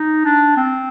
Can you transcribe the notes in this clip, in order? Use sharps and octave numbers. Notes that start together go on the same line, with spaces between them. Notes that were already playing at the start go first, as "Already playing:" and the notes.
Already playing: D#4
D4
C4